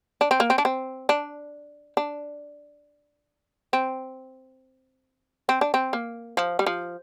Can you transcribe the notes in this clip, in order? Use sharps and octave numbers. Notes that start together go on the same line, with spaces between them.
D4
C4
A#3
C4
D4
C4
D4
D4
C4
C4
D4
C4
A#3
F3
G3
F3